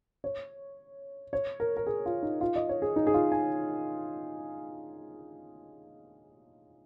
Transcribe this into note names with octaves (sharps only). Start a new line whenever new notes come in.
C#5
C#5
A#4
A#4
G#4
F4
D#4
F4
D#5
C#5
G#4
D#4
G#4
F4
G#5